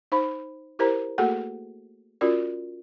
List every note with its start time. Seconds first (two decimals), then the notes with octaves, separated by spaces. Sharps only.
0.12 D#4 C5 B5
0.79 E4 G4 A#4 C5 A#5
1.18 A3 A#3 F#4 G#4 A4 F#5
2.21 C#4 F4 F#4 A#4 D5